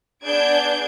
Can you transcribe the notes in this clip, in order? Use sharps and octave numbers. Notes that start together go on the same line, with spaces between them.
B3 D4 G#4 G6 G#6 D7